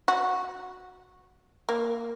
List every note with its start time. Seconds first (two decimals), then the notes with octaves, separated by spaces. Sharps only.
0.08 F#4
1.69 A#3